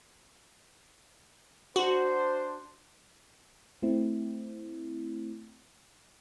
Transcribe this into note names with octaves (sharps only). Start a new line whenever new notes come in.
D4 F#4 C5
A3 C4 E4